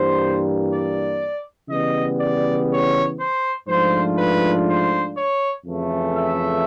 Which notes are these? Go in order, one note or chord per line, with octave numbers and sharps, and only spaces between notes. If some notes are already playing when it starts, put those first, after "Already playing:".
Already playing: G2 E3 G3 A#3 C5
D5
C#3 E3 G3 B3 D#5
D5
C#5
C5
G#2 F3 A3 D4 F4 C5
B4
C5
C#5
F2 C#3 E3 A3
E5